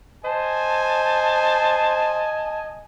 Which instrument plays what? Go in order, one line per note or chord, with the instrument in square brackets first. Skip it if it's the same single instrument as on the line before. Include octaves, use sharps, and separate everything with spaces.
[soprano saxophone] C5 [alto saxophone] D#5 [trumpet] G#5 [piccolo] A5